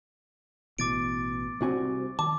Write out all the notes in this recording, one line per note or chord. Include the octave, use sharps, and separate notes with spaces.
A1 B2 E3 D6 A6 D7
C2 C4 D4 F#4 G#5
D#3 A5 D6